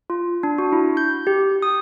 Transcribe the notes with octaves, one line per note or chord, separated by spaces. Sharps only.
F4
D4
F#4
E4
G6
G4
D#6